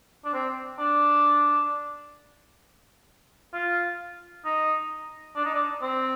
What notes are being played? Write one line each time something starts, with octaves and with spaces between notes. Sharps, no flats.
D4
C4
D4
F4
D#4
D4
D#4
D4
C4